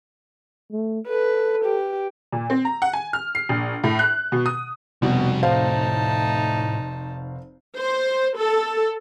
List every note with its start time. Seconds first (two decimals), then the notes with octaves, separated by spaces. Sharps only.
0.72 A3
1.09 A4 B4
1.65 G4
2.32 A#2
2.50 C4
2.65 A#5
2.82 F#5
2.93 G#5
3.13 F6
3.35 C7
3.49 A#1
3.84 A2
3.99 F#6
4.32 B2
4.46 D#6
5.02 F1 C2 B2 G3 F#4
5.43 A2 D#4 C5 F5 A5
7.78 C5
8.36 A4